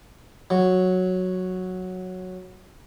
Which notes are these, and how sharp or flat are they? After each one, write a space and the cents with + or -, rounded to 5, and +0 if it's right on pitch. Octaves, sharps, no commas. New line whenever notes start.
F#3 -5